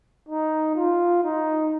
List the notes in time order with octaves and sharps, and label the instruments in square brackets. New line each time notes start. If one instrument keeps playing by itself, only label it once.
[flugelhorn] D#4
F4
D#4